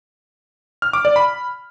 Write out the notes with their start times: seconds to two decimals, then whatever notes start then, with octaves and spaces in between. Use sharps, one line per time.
0.82 F6
0.93 D6
1.05 D5
1.16 B5